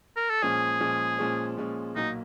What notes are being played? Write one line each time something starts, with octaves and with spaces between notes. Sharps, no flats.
A#4
A4
A#2 F3 G#3 C#4 G#4
A#2 F3 G#3 C#4
A#2 F3 G#3 C#4
A#2 F3 G#3 C#4
B1 A#2 F#3 A#3 D#4